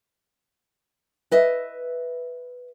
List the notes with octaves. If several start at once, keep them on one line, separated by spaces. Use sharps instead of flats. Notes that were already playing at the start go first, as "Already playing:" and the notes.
B4 D#5 E5